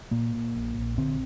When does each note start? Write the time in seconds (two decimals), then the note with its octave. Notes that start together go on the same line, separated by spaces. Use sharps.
0.11 A#2 A#3
0.34 A#2
0.55 A#1
0.77 A#1
0.98 D3 C4